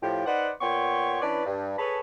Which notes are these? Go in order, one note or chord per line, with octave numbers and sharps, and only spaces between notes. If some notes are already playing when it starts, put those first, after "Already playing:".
A2 F3 G4
D#4 B4 C5 D5 F#5
A#2 B3 C#5 G5 C6 C#6
E3 C#4 D4 B4 D5
G2
G#4 A4 B4 C#5 A5 B5